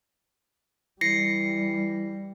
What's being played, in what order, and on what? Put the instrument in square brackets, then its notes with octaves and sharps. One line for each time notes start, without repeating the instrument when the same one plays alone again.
[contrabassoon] E3 [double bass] G3 [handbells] A#6 C7 C#7